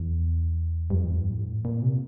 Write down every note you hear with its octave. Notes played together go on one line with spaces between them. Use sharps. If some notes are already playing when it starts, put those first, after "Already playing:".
Already playing: E2
G2
F2
E2
F2
G2
A2
A#2
C3